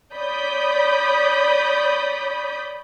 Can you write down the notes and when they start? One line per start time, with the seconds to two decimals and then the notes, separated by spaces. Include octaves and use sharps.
0.15 C#5 D5 B5 D#6 G6 B6